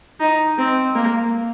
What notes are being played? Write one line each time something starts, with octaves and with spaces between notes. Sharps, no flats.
D#4
C4
A#3